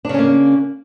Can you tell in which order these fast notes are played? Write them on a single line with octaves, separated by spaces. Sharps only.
D4 C#3 C#4 A#3